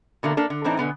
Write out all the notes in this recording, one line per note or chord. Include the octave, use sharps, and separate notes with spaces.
B2 D3 A3 A#3
A#3 D4 A4
D3
A2 E3 C4 D4 D#4
B2 D3 B3 G#5